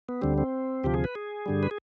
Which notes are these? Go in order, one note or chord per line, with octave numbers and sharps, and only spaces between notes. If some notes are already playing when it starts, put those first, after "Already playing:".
B3
D2 D3 G3 C4
C4
D2 C3 F3 G4
G#4
B4
G#4
G2 D3 G3
B4
G#4